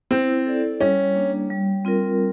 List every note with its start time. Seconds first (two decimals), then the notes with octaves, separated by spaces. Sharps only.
0.11 C4 E4
0.46 A4 D5
0.80 G3 C#4
1.15 A#3 D4
1.50 G3
1.85 C4 F4 A#4